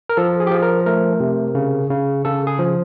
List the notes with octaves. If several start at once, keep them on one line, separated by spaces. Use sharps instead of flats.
A#4
F3 A4
G#4
G4
F3 G#4
A#4
A3 A#4
C3
C#3
C#3
C#3 A4
G#4
F3